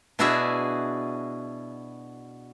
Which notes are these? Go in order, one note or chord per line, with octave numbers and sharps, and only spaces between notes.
B2 D4 E4 F#4 G#4 E5